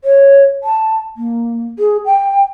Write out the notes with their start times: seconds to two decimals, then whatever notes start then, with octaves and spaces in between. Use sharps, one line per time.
0.04 C#5
0.64 A5
1.17 A#3
1.79 G#4
2.06 G5